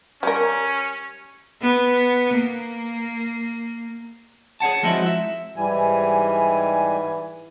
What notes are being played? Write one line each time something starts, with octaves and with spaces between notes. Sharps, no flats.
G3 C#4 A#4
B3
A#3
G#4 C#5 F#5 A5
F3 G#3 C4 D#4 E4 F#4
E5
G#2 E3 G3 G#5